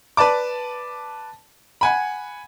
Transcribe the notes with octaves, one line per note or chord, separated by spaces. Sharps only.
B4 D5 A5 D6
F#5 G#5 B5